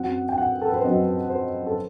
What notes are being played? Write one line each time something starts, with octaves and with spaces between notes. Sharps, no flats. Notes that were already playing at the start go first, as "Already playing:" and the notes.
Already playing: F#2 F#3 C4 F#5
G5
F#5
A4
B4
C5
F#2 F#3 C4 D#5
C5
A4